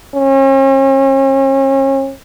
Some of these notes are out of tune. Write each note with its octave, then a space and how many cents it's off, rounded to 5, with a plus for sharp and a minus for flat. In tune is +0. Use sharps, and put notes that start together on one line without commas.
C#4 -40